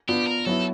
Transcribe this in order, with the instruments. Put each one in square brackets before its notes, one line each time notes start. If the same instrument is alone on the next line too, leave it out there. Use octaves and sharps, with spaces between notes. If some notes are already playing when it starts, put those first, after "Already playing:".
[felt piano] B3 D4 F4 [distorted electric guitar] G4
[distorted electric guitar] A#4
[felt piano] F#3 B3 E4 [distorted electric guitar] A4